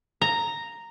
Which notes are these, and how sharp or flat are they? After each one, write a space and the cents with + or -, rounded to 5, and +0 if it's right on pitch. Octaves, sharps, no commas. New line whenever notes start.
A#5 -5